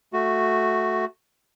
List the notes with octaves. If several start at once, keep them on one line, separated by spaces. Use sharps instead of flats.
A3 F#4